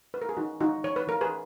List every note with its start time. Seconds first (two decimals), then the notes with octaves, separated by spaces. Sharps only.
0.14 B4
0.22 A#4
0.29 G#4
0.37 E3 D#4 F#4
0.60 E3 D#4 F#4
0.84 E3 C#5
0.96 B4
1.07 E3 A#4
1.21 G#4 B4